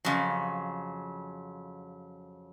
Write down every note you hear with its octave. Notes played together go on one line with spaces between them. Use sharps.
F2 C#3 F#3